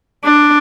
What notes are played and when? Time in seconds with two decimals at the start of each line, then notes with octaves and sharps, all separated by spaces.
0.25 D4